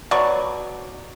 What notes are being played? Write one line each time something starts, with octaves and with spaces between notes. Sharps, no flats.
B2 F#3 D5 C#6